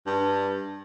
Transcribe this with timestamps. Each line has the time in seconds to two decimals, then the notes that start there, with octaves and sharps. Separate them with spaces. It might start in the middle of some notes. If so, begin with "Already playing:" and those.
0.07 G2